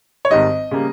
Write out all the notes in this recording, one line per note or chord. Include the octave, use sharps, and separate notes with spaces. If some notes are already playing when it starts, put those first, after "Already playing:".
C#5
G#1 G#2 D#3 G3 D#5
C#3 G3 A#3